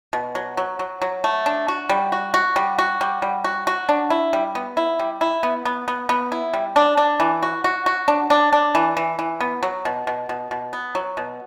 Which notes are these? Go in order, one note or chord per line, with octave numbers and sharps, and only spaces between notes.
B2
F#3
F#3
F#3
F#3
A3
D4
F#4
G3
F#4
F#4
G3
F#4
G3
G3
F#4
F#4
D4
E4
G3
B3
E4
G3
E4
B3
B3
B3
B3
E4
G3
D4
D4
E3
F#4
F#4
F#4
D4
D4
D4
E3
E3
E3
B3
F#3
B2
B2
B2
B2
B3
F#3
B2